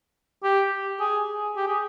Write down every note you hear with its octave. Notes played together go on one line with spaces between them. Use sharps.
G4
G#4
G4
G#4